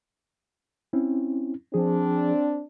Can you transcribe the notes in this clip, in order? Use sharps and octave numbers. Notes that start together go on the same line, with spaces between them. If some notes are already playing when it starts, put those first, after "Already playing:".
C4 C#4 E4
F3 C4 D4 G#4